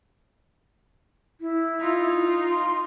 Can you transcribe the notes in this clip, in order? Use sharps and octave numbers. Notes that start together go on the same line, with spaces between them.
E4
D#4 F4
C6